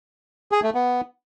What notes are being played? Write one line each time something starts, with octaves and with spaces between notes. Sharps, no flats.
G#4
A3
B3